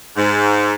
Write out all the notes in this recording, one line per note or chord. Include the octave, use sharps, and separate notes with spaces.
G#2